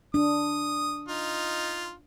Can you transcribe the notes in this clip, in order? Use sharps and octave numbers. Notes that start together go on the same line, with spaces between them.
D4 D#6
D#4 F4